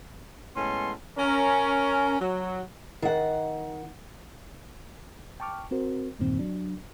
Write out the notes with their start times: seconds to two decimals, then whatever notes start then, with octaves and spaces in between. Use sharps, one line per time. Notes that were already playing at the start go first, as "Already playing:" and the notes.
0.56 A2 G#3 B3 C#4 A4 C6
1.18 C#4 A#4
2.20 F#3
3.02 D#3 F#5
5.40 G5 A5 C#6 D6 F6
5.71 C4 F#4 A#4 C5
6.19 E2 G2 A#2 D#3 C4
6.39 F#3 D4